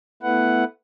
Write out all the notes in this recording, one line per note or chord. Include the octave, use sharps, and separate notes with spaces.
A3 B3 E4 B4 F#5